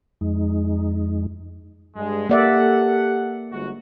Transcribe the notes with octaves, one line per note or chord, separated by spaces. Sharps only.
F2 G#3 D#4
G2 G#3
A#3 G4 A4 D5 E5 F#5
G1 G#2 F#4